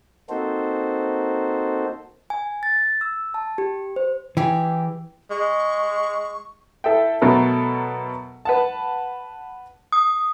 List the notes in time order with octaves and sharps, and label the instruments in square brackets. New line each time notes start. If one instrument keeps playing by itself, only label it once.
[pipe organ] A#3 C4 D#4 F#4 A4 C5
[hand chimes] G#5
A6
E6
A5
G4
C5
[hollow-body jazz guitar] E3 [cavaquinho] G4 G#4
[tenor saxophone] G#3 [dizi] C#6
[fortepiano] E4 A4 E5 G5
B2 F#3 A3 A4 A#4
B4 F#5 A5
[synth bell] D#6